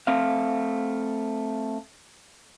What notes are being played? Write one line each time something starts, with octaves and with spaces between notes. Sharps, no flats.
A3 C4 F5